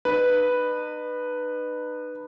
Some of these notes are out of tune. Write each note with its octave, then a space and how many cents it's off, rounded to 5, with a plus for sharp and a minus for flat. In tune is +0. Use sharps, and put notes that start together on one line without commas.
D#4 -40 B4 +0